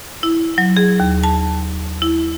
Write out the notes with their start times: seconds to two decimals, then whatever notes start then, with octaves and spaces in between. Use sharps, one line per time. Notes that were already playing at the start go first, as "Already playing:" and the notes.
0.23 E4
0.58 F#3
0.77 G#4
1.00 D#2
1.24 A5
2.02 E4